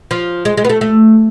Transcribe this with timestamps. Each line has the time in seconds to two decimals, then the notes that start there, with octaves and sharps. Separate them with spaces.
0.11 F3
0.45 G#3
0.57 G#3
0.65 B3
0.69 A3
0.81 A3